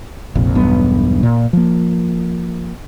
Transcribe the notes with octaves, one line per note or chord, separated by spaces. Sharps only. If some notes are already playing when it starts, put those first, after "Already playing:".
F1 A#1 F2
E1 B1 G2 B3
A#2
F3 A#3